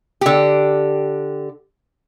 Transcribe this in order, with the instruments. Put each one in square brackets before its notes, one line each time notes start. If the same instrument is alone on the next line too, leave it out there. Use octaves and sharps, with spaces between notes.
[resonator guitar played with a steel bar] D3 G4